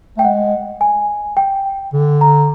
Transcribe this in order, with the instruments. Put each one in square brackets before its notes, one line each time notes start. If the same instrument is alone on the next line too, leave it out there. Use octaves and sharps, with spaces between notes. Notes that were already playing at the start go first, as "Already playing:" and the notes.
[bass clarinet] A3 [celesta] G5
[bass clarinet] G#3 [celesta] F#5
[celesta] G#5
G5
[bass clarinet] D3
[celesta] A#5